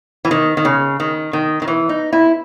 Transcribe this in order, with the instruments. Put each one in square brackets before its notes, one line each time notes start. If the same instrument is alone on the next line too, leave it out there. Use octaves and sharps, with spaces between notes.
[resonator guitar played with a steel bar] E3
D#3
D#3
C#3
D#3
D#3
D#3
E3
D#4
E4